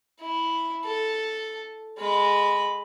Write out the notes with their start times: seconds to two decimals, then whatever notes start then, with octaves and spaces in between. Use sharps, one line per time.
0.21 E4
0.84 A4
1.98 G#3 B5